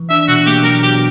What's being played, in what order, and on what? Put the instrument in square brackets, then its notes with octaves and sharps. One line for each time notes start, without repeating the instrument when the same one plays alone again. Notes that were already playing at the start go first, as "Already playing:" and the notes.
Already playing: [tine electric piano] E3
[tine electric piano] D4 [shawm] E5
[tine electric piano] B2 [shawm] F#4
[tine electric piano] A#3 [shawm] G4
[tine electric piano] F#3 [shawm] A#4
[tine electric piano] B2 [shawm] G4